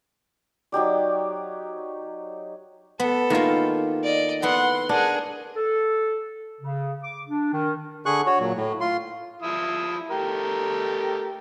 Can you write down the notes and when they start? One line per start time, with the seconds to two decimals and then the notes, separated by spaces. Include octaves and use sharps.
0.72 F#3 D#4 G4 D5
3.00 B3 A4
3.30 D#3 A3 A#3 E4 F4
4.03 D5 D#5
4.42 B3 E4 A4 F#5 C6
4.89 D4 G#4 A#4 F#5
5.55 A4
6.61 C#3
7.03 D6
7.27 D4
7.52 D#3
8.06 D3 G#4 C#6 F#6
8.26 F#4 C#5
8.40 A#2 F#3
8.55 A2
8.81 F4 C6
9.42 F3 E4 D#6
10.10 A3 G4 A#4